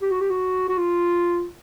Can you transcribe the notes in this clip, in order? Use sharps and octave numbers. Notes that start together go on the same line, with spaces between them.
G4
F#4
G4
F#4
F#4
F4